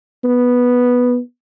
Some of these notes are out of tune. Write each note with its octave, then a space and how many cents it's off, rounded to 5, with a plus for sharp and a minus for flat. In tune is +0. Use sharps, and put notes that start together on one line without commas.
B3 -5